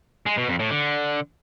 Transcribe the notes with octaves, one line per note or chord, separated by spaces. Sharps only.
G#3
B2
F2
A2
D3